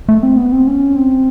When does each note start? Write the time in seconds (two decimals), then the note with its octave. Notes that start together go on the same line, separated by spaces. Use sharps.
0.09 A3
0.23 C4
0.37 B3
0.52 C4
0.67 C#4
0.96 C4